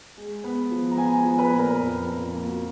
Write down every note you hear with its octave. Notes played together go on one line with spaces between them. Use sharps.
G#3
B3
F3
A#5
B3 G#5
G#5
F3
B4
A#2
A#4
F2
F2
A#3
F#4